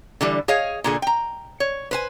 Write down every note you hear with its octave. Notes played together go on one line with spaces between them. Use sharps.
D3 E3 G3
G#4 C#5 D#5 F5
A#2 D3 G#4
G5 A#5
C#5
B4 C5 G#5